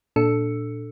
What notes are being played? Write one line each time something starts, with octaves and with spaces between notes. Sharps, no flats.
A#2 D4 A4 E6 C#7